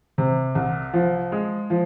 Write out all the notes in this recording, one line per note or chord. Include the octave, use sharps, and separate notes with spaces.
C3
C2
F3
G#3
F3